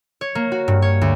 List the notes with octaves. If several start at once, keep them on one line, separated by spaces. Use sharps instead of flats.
C#5
A#3
F#4
G2
C#5
D2